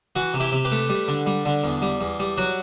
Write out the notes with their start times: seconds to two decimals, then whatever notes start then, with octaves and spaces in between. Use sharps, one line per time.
0.16 E3 F#4
0.34 C3
0.40 E4 G4
0.52 C3
0.65 G4 B4
0.71 A3
0.90 G3
1.08 D3
1.26 G3
1.45 D3
1.64 E2
1.82 G3
2.01 E2
2.19 G3
2.37 F#3 F#4